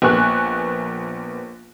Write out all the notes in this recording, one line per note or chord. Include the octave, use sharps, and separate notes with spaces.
A#1 A#3 B3 G#5 C#6 F#6